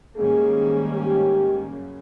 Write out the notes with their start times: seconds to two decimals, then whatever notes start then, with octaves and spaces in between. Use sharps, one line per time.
0.16 G#2 D#3 G3 A#3 C#4 G#4
0.93 G4
1.71 F#2 C#3